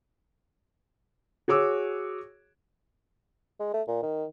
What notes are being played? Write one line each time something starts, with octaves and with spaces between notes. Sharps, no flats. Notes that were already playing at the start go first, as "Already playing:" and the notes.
F#4 G#4 C#5 D6 E6
G#3
A3
A#2
D#3